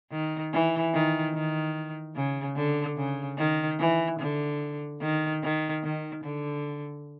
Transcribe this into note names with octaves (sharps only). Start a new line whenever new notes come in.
D#3
E3
D#3
D#3
C#3
D3
C#3
D#3
E3
D3
D#3
D#3
D#3
D3